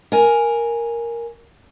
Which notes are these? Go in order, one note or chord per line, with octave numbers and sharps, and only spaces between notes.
A#4 G#5